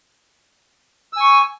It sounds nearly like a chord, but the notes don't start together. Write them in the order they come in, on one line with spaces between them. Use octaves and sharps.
E6 G#5 C#6